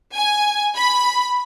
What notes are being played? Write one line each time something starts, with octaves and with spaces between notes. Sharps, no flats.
G#5
B5